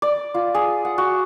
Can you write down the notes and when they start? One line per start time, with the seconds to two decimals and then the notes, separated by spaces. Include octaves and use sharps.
0.02 D5
0.35 F4
0.54 G#4
0.85 F#5
0.98 F#4